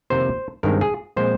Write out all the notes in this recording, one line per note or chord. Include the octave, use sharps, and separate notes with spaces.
F2 C3 D#3 A#3 C5
G2 D#3 G#3 C4 A#4
G#4
A#2 F3 G#3 C4 C5